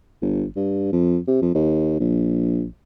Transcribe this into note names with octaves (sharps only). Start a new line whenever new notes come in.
G1
G2
F2
C3
F2
D#2
A#1